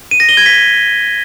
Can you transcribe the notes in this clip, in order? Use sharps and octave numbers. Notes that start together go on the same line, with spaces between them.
D#7
A#6
G7
G#6
B6